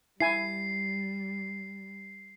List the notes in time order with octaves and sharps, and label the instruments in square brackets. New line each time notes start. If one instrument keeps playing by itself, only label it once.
[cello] G3 [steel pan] E4 G#5 [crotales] C7